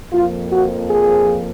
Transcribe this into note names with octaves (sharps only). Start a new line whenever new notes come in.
F2 F3 A#3 F4
F#4
G#4